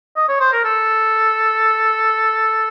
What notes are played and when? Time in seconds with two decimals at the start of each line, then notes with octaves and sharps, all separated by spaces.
0.17 D#5
0.29 C#5
0.40 C5
0.52 A#4
0.65 A4